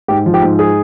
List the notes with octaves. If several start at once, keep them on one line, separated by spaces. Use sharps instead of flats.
G#2 G4
F3
G4
G#2
G#4